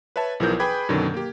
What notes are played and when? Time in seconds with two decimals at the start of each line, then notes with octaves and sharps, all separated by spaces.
0.16 B4 C#5 E5 A5
0.40 B1 E3 F3 G#4 A#4 G6
0.60 G#4 B4 G5 B5 D6 G#6
0.89 F#2 B2 D3 D#3 F#3
1.14 A#3 G4